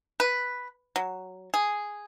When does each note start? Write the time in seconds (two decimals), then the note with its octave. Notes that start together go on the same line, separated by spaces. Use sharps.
0.20 B4
0.96 F#3
1.54 G#4